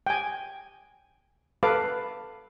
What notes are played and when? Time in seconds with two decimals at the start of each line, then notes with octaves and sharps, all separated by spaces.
0.07 G5 G#5
1.63 A4 B4 F5 D6